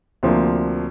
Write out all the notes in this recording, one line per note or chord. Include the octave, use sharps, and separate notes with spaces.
D2 C3 F3 A#3 D4